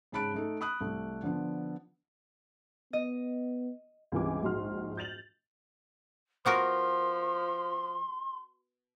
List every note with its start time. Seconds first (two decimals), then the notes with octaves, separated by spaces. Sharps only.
0.12 G#2 C#3 A5 B5 F#6 D7
0.34 A3 D#4 A4
0.61 B5 D#6 F#6
0.81 C2 A3
1.23 D3 F3 B3 D4
2.93 B3 D#5
4.12 C#2 G2 C3 E3 G#5 D6
4.42 A#1 G#2 F#4 C6 F6
4.97 G6 A6 F7 F#7
6.46 F3 B3 F#4 A#4 C6